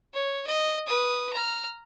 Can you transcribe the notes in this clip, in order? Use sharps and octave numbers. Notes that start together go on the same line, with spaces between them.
C#5
D#5
B4 D#6
A#5 F6